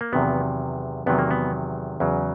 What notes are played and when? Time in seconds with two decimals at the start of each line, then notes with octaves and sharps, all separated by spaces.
0.01 A#3
0.12 E2 C3 D#3 F#3 B3
1.06 E2 C3 D#3 F#3 B3
1.18 A#3
1.31 B3
2.00 E2 C#3 F#3